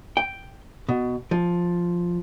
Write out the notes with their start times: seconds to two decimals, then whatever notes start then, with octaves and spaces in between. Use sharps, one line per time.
0.17 G5
0.89 B2
1.31 F3